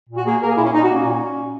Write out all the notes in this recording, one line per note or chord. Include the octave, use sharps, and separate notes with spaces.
A#2
F#4
A#3 G#4
A#3 A#4
G#4
A#2 E4
C#4
A#2 D#4
F#4
A#3
C#4
A#2